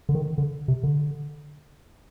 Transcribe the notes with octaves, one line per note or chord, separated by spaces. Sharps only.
D3
D#3
D3
C3
D3